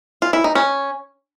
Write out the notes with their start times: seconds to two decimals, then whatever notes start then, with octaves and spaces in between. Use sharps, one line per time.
0.22 F4
0.33 E4
0.44 D#4
0.55 C#4